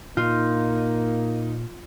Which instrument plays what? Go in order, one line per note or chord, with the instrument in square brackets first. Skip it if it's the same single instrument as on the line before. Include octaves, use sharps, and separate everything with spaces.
[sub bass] A#2 [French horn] A#3 [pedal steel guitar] D#4 [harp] F4